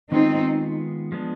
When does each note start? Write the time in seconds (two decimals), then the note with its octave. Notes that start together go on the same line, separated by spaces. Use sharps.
0.11 D#3 G#3 B3 C4 D#4 F4 G#4
1.12 F3 G#3 B3 D4